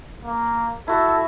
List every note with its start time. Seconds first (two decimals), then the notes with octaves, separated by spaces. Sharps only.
0.25 A#3
0.88 E4 F#4 A4